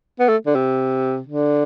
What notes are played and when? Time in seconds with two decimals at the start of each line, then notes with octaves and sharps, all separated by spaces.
0.20 B3
0.29 A3
0.46 D3
0.55 C3
1.27 D3